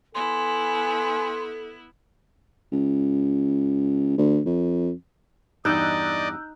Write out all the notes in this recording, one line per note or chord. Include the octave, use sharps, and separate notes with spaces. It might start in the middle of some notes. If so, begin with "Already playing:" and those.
B3 E4 A4 G#5 C6
C#2
D2
F2
E2 G2 D#4 D5 D#5 E6 F#6 G6